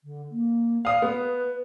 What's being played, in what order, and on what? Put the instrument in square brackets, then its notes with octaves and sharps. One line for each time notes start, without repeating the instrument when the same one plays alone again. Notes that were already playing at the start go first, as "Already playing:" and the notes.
[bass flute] D3
A#3
[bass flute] D5 [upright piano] F5 D#6
[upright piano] B3 [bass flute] B4